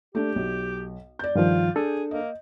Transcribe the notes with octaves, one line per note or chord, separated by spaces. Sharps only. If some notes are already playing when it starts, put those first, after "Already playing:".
A3 D4 G4
B1
D5 G6
G2 D#3 F3 F4
D4 G#4 A4
A#3 D#5